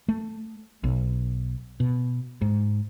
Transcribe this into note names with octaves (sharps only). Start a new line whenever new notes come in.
A3
B1
B2
G#2